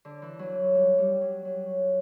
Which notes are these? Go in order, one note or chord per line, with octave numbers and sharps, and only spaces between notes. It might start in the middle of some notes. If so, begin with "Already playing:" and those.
D3
E3
F#3
G3
G3
F#3
F#3